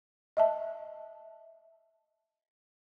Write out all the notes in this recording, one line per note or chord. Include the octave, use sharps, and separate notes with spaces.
D#5 E5 A5